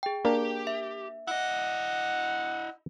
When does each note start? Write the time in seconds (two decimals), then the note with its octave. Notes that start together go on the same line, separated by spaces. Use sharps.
0.03 G#4 G5
0.25 A#3 D4 G4 A#4
0.67 E5
1.27 E4 D#5 F#5